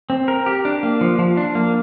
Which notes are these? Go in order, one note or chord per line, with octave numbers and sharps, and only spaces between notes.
C4
A#4
G4
D4
A#3
F3
F3
D4
A#3